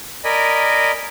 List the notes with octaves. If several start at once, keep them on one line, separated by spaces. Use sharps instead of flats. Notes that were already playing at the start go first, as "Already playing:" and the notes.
A#4 D5 D#5 G#5 B5